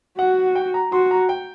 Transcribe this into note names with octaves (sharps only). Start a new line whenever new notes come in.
F#4 F#5
G5
A#5
F#4 C6
A#5
G5